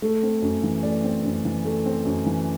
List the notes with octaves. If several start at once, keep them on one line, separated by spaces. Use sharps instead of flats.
A3 A4
C4
F#2
E3
A3 D5
C4
F#2
E3
A3
C4
F#2
E3